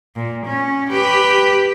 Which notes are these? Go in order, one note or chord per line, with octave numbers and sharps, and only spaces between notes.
A#2
C#4
G4 B4